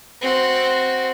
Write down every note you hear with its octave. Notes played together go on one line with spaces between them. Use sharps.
C4 F#4